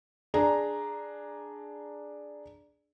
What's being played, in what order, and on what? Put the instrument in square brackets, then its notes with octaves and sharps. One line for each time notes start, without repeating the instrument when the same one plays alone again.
[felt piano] D4 G#4 A#5